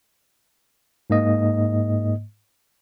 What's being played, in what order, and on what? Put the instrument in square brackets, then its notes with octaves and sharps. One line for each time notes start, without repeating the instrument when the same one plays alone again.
[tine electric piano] G#2 A#3 D#5